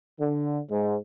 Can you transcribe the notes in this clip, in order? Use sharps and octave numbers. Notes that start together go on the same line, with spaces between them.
D3
G#2